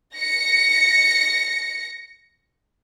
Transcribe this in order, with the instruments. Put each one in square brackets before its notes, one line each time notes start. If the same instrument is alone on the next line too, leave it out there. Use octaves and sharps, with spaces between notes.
[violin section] A#6 C#7